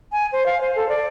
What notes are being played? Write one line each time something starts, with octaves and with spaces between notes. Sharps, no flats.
G#5
C5
F5
C5
A4
D5